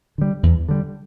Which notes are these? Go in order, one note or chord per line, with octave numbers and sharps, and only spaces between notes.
D3 G3
E2
D3 G3